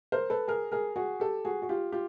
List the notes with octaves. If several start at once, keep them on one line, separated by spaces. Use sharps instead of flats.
A#4 C5
A4 B4
G#4 A#4
G#4 A#4
F#4 G#4
G4 A4
F#4 G#4
F#4
F4 G4
F4 G4